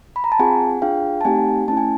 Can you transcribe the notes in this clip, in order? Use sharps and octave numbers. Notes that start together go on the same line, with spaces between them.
B5
A#5
A5
C4 F4 G#4 F#5 G#5
D4 F4 G#4 F5 G5
A5
A3 C4 D#4 G4 F#5 G#5
A3 C#4 E4 A5
G#5